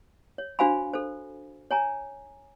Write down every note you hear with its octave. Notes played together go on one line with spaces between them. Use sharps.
C#5
D4 F#4 C5 F5 G#5 B5
A4 C5
C#5 G#5 A#5